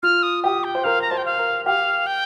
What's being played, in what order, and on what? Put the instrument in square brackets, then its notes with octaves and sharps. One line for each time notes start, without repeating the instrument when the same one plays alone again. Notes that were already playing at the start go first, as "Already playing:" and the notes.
[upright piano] F4 [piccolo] F6
[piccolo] D#6
[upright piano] G4 [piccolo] D#6
[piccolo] G5
[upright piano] C5
[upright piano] A#4 [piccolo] F5
[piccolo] A#5
[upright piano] C5 [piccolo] A5
[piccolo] G5
F5
[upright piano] A#4
[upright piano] G4 [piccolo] F5
[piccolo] G5